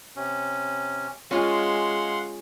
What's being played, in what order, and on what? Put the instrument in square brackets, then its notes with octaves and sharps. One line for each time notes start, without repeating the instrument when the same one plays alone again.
[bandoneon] C3 C#4
[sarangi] G#3 [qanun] C#4 F4 [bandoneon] F5 F#5 C6